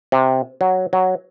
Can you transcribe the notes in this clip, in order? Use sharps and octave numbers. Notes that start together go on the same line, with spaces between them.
C3
F#3
F#3